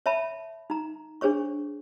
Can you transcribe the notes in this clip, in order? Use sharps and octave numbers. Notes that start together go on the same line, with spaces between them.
C#5 E5 A5 B5
D#4 A#5
D4 G#4 C5 C#5 C#6